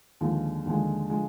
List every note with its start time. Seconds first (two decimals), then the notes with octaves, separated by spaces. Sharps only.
0.21 D#2 D3 F3 G#3
0.65 D#2 D3 F3 G#3
1.10 D3 F3 G#3